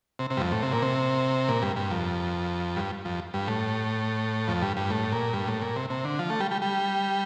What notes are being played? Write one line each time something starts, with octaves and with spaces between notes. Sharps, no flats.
C3
C3
G2
F2
A2
C3
A#2
C3
A#2
G2
G2
F2
G2
F2
G2
A2
F2
G2
G2
A2
A#2
G2
A2
A#2
C3
C3
D3
F3
A3
G3
G3
G3